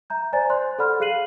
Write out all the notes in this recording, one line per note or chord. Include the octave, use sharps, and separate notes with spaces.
E5 A#5 G6
C5 D5 G#5 A#5 A6
C5 D5 C6 F#6
A4 D5 F#5 B5 F6
G#4 F5 F#6 C7 D#7 F#7